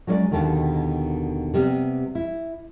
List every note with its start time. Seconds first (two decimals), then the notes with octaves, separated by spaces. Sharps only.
0.07 F#3 G#3 C#4 C5 D5
0.31 D#2 B2 D3 D#3
1.54 C3 G3 B3
2.15 E4